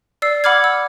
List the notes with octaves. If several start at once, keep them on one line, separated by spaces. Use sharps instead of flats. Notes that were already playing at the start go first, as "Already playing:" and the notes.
D5 E6 C7
F#5 B5 D6 F6 G#6
E6